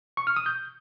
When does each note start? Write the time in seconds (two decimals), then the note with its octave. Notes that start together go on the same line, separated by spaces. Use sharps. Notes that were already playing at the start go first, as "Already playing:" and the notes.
0.17 C#6
0.27 F6
0.36 D#6
0.46 G6